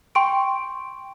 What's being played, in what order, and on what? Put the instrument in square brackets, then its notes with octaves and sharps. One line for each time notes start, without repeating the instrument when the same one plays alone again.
[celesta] G5 C6 C#6 D7